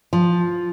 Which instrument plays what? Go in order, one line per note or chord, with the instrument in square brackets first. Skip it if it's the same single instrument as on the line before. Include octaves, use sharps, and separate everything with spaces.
[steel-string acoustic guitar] F3